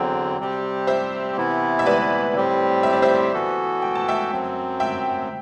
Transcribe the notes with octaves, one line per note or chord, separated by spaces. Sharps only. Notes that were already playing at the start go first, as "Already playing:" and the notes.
Already playing: E2 D3 F#3 C4 G5
C3 G3 C4 G4
C5 E5
C3 E3 B3 E4
E5
B4 D5
A2 G3 C4 G4
E5
D5
C5 E5
E3 B3 F#4 A4
G5
A5
E5 G5
F#2 F#3 C4
E5 G5